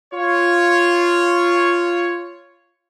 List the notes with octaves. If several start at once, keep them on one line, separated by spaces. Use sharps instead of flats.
F4 C#5